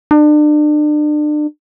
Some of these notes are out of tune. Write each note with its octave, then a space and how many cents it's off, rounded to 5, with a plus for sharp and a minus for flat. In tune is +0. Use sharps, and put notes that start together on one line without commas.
D4 +35